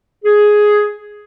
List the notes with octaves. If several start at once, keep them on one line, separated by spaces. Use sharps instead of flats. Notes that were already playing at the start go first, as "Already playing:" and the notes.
G#4